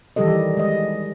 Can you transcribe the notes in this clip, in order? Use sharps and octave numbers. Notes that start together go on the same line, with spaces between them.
D#3 E3 G3 G4 A4 D#5
G#3 D#5